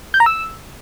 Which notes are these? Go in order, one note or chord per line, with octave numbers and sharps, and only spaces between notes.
G6
A#5
E6